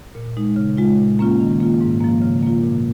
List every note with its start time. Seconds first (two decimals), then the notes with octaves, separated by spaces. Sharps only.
0.15 A#2
0.37 G#3 D#4
0.56 C#3
0.77 G#3 F4
0.99 A#2
1.19 A#3 C#4 F4
1.40 D#3
1.60 A#3 F4
1.81 G#2
2.01 F3 A#3
2.22 C#3
2.43 A#3 F4
2.63 A#2